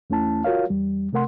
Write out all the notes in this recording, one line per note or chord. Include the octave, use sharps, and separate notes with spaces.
E2 A3 C#4 E4 A5
F4 F#4 A#4 C#5 F5
E2 G3
C3 A3 A#4 F#5 C6